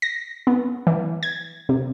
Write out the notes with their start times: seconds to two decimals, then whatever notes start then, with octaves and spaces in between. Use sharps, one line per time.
0.02 A#6
0.47 B3
0.87 E3
1.23 G#6
1.69 C3